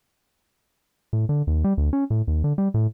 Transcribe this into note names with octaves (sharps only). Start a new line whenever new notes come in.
A2
D3
D#2
G3
D2
C#4
A2
D#2
D3
G3
A2